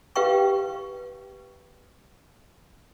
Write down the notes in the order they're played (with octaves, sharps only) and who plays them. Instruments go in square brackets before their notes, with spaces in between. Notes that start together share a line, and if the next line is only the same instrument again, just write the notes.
[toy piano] G4 B4 F5 G5 C#6